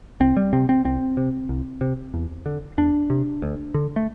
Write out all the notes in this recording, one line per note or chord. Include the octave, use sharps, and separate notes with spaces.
C2 C4
G3
C3 C4
C4
C2 C4
C3
C2
C3
E2
D3
E2 D4
C3
D2
D3
A3